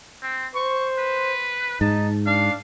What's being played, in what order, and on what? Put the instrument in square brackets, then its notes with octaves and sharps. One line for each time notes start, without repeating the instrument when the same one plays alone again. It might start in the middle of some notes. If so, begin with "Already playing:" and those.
[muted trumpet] C4
[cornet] C5 [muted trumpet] C#6
[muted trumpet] B4
[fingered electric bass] G#2 [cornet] D#4 [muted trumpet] A5
[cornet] D4 [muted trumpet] F5